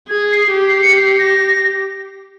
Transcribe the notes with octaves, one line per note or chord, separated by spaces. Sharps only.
G#4 G#6
C7
G4
C7
C#7
C7
A#6